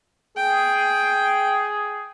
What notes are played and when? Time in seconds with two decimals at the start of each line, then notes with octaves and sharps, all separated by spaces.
0.37 G#4 G5